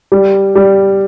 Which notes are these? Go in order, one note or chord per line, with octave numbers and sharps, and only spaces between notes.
G3
G3